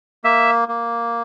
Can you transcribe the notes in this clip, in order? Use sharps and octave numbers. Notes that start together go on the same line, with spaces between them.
A#3 E5
A#3